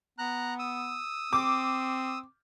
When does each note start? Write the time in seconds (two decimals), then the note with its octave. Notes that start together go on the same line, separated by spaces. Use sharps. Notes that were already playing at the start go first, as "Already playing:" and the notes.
0.18 B3 A#5 F#6
0.59 D#6 E6
1.33 C4 D6